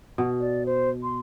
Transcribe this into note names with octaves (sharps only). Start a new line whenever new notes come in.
B2
D5
C5
C6